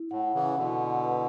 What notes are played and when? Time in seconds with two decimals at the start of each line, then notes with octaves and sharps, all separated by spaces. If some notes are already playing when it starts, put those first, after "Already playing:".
Already playing: E4
0.11 A2 F#5
0.34 C#3 E3
0.57 B2 D3 E4
1.04 B4